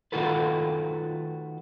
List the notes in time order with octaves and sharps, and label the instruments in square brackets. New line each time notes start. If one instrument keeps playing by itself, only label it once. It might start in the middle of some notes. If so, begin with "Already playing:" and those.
[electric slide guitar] D#3 A3 F4 F#4 A4 B4